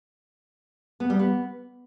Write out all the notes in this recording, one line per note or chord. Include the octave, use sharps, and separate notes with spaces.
B3
G3
B3